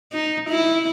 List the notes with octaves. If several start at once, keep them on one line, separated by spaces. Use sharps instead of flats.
D#4
E4